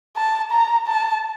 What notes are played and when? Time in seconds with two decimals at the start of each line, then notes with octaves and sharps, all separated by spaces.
0.16 A5
0.51 A#5
0.87 A5